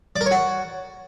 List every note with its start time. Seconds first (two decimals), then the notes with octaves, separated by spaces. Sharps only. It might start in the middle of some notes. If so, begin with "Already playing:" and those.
0.16 D5
0.21 A#4
0.26 C#5
0.31 F#4